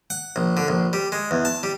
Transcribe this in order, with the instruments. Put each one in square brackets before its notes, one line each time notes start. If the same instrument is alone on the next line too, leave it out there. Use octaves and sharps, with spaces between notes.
[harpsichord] F#5
A#1
D3
A#1
G3
G#3
E2
A5
G3